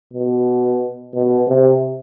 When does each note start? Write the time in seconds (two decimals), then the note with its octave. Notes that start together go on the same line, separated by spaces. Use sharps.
0.13 B2
1.14 B2
1.47 C3